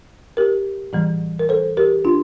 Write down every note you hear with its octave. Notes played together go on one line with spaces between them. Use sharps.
G4 A#4
A2 E3 G3
A#4
A4 C5
G4 A#4
D4 F4